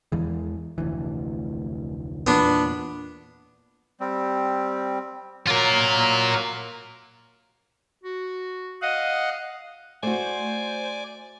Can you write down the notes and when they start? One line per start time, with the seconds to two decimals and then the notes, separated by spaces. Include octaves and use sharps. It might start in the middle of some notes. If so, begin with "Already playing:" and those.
0.12 E2 E3 G#3
0.78 F1 D2 E3
2.27 E2 A#2 B3 D4
4.00 G3 C4
5.47 F#3 A#3 F4 A#4
8.04 F#4
8.82 D#5 F5 F#5
10.03 A3 F#4 C5 D5 G#5